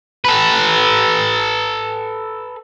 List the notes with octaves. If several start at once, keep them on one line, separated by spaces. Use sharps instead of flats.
A4 B4